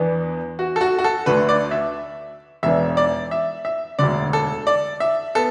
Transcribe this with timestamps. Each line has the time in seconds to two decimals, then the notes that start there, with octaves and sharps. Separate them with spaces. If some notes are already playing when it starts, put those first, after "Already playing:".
Already playing: E2 E3 B3 D4
0.59 F#4
0.76 A4
0.81 F#4
0.98 F#4
1.04 A4
1.26 D2 D3 A3 B4
1.49 D5
1.71 E5
2.63 E1 E2 E3 D4 E5
2.97 D5
3.31 E5
3.65 E5
3.99 E1 D2 D3 D5
4.33 A4
4.67 D5
5.00 E5
5.35 B3 A4